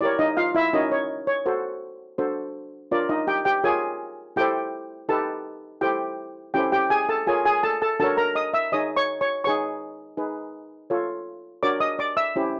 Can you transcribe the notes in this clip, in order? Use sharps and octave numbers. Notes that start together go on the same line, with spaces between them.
E4 G4 A#4 C#5 D5
D#4 D#5
F4 F5
E4 E5
C#4 D#4 F#4 A#4 C#5 D#5
C#5
C#5
F#4 A4 C5
D4 F#4 A4 C5
D4 F4 A#4 C#5 D5
D#4 D#5
G4 G5
G4 G5
F4 G#4 A#4 C#5 G#5
E4 G4 A4 C5 G5
D#4 G4 A4 B4 A5
E4 G4 A4 C5 G5
C#4 E4 G4 A4 C5 G5
G4 G5
G#4 G#5
A4 A5
F4 G#4 A#4 C#5 G#5
G#4 G#5
A4 A5
A4 A5
D4 F#4 A4 A#4 C#5 A5
A#4 A#5
D#5 D#6
E5 E6
D#4 G#4 C#5 D#5 D#6
C#5 C#6
C#5 C#6
D#4 G#4 B4 C#5 C#6
D#4 G#4 B4
F4 A4 C#5
D4 F#4 A#4 C#5 D5 D6
D#5 D#6
D5 D6
E5 E6
C#4 E4 G4 C5